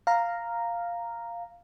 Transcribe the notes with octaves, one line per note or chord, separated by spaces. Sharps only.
F5 A#5